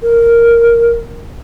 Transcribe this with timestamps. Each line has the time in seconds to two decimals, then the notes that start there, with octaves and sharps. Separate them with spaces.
0.03 A#4